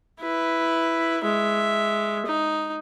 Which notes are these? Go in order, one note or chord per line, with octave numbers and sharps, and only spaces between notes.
E4 B4
G#3 E5
D#4